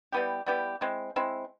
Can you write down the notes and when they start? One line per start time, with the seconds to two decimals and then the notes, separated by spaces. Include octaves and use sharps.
0.12 G3 B3 E4 G4
0.46 G3 B3 E4 G4
0.81 G#3 C4 E4
1.16 G#3 C4 E4